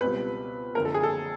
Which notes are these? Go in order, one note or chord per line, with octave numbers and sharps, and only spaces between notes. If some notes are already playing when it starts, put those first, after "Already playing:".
C#2 B2 G3 C4 B4
F#1 F2 D3 A#4
A4
G#4
A4